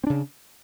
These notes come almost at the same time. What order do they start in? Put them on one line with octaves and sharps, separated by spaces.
C4 D4 C#3